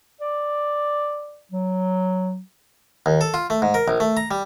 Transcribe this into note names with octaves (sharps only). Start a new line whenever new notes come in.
D5
F#3
D#2
A4
F4
A3
G#2
A#4
A#1
A3
A#5
G3